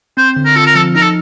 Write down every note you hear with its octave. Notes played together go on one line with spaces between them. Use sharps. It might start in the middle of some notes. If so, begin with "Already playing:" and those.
C4 C5
D3
A#4
F4 A4
A#4
F3 A4
D#4 A#4
A4